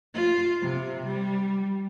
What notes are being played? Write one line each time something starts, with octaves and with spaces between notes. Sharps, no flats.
F4
C3
G3